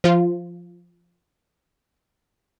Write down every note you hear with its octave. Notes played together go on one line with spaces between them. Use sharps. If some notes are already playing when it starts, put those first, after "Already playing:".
F3 F4